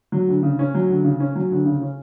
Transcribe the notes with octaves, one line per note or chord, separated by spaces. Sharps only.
F#3
D2
C#3
C#4
F#3
D2
C#3
C#4
F#3
D2
C#3
C#4